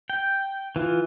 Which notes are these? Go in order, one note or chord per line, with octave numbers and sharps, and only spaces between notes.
G5
E3 F4